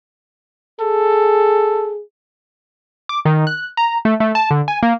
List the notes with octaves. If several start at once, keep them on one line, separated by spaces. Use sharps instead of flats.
G#4 A4
D6
D#3
F#6
A#5
A3
A3
A5
D3
G#5
A#3